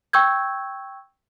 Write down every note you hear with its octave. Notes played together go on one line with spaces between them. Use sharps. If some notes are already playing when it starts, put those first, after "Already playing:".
G5 C#6 E6 G6 G#6